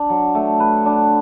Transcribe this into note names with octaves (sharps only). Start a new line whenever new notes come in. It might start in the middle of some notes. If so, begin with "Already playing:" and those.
Already playing: D4
F#3
A3
B4
D4